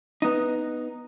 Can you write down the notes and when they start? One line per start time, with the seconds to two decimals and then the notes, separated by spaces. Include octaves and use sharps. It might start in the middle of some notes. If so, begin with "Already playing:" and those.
0.22 B3 D#4